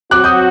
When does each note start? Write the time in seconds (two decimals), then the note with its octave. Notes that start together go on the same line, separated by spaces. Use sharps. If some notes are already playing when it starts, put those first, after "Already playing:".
0.11 F#3 C4 F#4 D6 F#6
0.24 D#6 G6